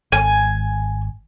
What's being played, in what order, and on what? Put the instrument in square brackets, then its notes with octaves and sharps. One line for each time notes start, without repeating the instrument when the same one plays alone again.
[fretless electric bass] G#1 [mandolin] G#5